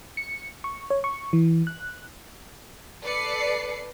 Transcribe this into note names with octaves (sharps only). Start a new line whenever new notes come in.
C#7
C#6
C#5
C#6
E3
F#6
A4 B4 D5 C7 C#7